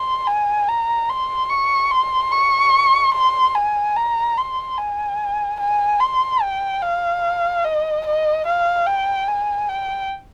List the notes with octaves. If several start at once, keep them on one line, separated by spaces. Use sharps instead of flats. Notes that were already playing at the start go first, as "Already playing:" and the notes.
Already playing: C6
G#5
A#5
C6
C#6
C6
C#6
C6
G#5
A#5
C6
G#5
G#5
C6
G5
F5
D#5
D#5
F5
G5
G#5
G5